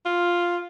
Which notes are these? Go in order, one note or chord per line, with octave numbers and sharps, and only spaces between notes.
F4